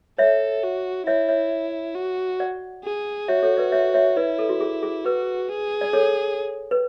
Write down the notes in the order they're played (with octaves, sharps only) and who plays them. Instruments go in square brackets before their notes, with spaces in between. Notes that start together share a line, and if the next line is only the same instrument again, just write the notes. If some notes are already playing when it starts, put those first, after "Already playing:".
[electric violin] A4 [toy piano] C#5 E5
[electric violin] F#4
[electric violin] E4 [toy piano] C#5 E5
[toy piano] C#5 E5
[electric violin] F#4
[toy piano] D5 F#5
[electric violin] G#4
[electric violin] F#4 [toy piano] C#5 E5
[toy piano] A4 C#5
B4 D5
C#5 E5
C#5 E5
[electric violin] E4 [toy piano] B4 D5
[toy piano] A4
F#4
G#4
G#4
[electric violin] F#4 [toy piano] B4
[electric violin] G#4
[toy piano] D5
A4 C#5
B4